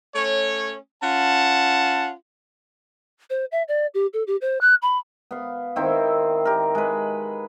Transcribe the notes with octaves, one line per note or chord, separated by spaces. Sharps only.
A3 C#4 C#5
C#4 F4 F#5 A5
C5
E5
D5
G4
A4
G4
C5
F#6
B5
B3 F5
D#3 C4 E4
G4 A#4
G#3 B4